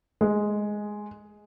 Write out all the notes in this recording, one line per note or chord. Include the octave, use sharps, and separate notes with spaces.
G#3